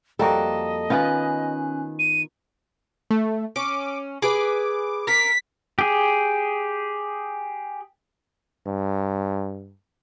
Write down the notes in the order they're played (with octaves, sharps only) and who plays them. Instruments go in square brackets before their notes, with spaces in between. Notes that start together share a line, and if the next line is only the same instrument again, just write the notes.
[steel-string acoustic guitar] F2 A4 [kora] G3 A#3 F#4 [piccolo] D#5
[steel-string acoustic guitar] D#3 [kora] B3 F4 B4 [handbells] C#4 G#5 F#6
[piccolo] D#7
[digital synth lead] A3
[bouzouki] C#4 [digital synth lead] D6
[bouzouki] G#4 B4 G#5 [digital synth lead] D6
[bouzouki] A#4 [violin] B6
[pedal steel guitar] G4 G#4
[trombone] G2